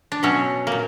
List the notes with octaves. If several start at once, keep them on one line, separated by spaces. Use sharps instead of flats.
D4
B2 F#3 C#4
A#2 A#3